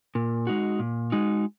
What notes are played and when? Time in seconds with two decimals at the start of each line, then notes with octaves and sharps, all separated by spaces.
0.15 A#2
0.47 G#3 D#4 F#4
0.79 A#2
1.12 G#3 D#4 F#4